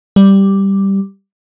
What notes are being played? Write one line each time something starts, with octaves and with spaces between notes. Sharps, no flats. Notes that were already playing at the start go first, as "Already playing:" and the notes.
G3